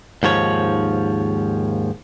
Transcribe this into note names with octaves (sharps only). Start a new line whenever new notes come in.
D#2 G#2 F3 C#5